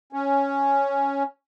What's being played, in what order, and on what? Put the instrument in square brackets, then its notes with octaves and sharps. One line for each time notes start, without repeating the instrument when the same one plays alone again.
[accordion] C#4